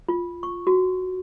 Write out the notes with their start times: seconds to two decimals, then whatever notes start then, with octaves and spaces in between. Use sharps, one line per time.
0.08 F4
0.43 C#6
0.67 F#4